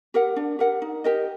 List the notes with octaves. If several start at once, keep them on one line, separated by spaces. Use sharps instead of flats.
G4 A#4 F#5
D4
G4 A#4 F#5
D#4
G4 A#4 D#5